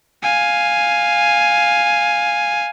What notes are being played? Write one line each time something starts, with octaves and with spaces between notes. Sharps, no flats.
F5 G#5